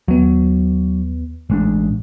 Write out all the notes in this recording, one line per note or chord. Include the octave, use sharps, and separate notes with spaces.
D#2 F#3 B3
A1 A2 G#3 D4